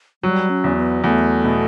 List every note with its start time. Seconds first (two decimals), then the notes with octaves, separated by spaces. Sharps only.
0.23 F#3 G3
0.50 C#4
0.64 E2
0.77 B3
1.04 E2 A3
1.44 B2